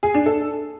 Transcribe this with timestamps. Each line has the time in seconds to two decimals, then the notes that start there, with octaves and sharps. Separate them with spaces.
0.03 G#4
0.14 D4
0.26 A4